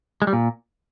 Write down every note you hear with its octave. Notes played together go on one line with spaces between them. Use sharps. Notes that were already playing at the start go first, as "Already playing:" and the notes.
G#3
G3
A#2